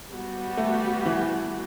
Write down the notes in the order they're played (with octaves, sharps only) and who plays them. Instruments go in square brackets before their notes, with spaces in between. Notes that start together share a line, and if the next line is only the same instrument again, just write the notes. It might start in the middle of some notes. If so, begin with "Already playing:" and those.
[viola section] G3 B3 F#4
[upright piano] A3
E3